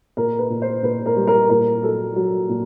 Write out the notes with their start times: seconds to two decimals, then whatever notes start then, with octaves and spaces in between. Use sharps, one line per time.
0.17 A#2 A#4
0.39 B4
0.50 A#2
0.62 C5
0.83 A#2 B4
1.06 A#4
1.16 G3
1.27 A#4
1.50 A#2 A#4
1.82 F#3 A4
2.16 F#3
2.49 A#2